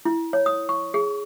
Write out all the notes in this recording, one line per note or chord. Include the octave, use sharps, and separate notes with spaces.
E4
C#5
D#6
C#6
G#4